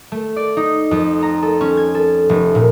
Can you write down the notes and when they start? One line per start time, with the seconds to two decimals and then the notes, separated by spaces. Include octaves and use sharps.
0.12 A3
0.36 D5
0.57 D#4
0.91 F2
1.22 A#5
1.43 A4
1.61 C#4
1.77 G#6
1.95 A4
2.29 F1
2.55 A#2